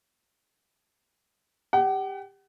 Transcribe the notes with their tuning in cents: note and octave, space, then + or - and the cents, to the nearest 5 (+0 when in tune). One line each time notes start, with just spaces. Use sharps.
G4 +20 F#5 +40